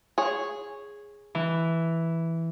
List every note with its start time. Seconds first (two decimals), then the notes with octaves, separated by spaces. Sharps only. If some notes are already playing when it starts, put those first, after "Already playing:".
0.18 G#4 C#5
1.35 E3